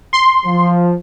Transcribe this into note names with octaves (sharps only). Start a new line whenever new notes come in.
C6
F3